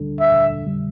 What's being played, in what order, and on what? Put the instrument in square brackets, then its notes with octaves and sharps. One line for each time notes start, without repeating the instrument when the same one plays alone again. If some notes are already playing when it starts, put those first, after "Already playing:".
Already playing: [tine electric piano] D2 D3 G3 D4 A4
[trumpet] E5
[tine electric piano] F2 D3 G3